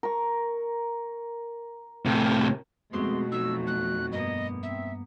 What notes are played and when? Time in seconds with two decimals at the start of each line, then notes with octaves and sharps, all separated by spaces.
0.03 A#4 C#6
2.05 A2 C3
2.93 F2 B2 G#3 A3 B3 C4 F#4 C6
3.32 F#3 D#4 E6
3.67 F#6
4.12 G2 A#3 B3 D#5
4.63 C4 E5